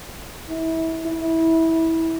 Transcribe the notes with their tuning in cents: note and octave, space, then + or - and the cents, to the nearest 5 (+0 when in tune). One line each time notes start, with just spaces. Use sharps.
E4 -25
E4 -20